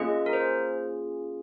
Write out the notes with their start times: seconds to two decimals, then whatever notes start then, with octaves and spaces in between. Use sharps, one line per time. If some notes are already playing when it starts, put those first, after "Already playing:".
Already playing: A#3 C#4 F4 G#4 D#5
0.26 A#4
0.33 C5